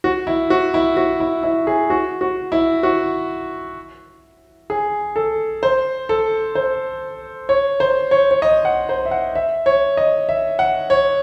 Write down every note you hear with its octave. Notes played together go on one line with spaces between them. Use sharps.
F#4
E4
F#4
E4
F#4
E4
E4
G#4
F#4
F#4
E4
F#4
G#4
A4
C5
A4
C5
C#5
C5
C#5
C#5
D#5
F#5
C5
E5
F#5
E5
C#5
D#5
E5
F#5
C#5